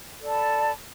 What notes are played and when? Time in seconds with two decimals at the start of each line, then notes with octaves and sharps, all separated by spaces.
0.17 A4
0.22 D5
0.27 A5
0.31 B5